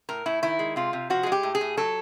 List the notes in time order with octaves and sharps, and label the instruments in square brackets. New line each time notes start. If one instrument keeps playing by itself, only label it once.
[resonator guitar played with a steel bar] A2 A#4
A2 E4
D#3 E4
G#3
C3 F4
C3
F3 F#4
G#4
G#3
G4
A2
G#4
A2
F#3 A4